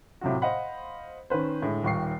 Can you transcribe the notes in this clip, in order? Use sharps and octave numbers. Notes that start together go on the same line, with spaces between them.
A2 C3 F#3 F4 F#4
C5 D#5 F5 F#5 B5
D#3 C#4 B4 C5
A2 D3 G#3
D#1 D#2 C#6 C7